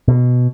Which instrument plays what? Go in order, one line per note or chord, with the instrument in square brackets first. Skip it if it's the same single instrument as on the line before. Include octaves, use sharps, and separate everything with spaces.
[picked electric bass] B2